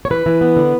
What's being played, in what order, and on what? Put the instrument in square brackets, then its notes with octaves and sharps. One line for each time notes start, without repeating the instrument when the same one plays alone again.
[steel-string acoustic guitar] C#5
E3 B4
E3
B3
D3